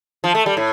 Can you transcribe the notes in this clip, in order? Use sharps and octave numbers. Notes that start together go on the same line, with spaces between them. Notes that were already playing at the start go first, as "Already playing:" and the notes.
F3
A3
G3
A2